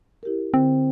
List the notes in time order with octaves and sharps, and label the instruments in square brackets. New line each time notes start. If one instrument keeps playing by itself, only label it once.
[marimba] E4 G4 A#4
[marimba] D3 [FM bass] C4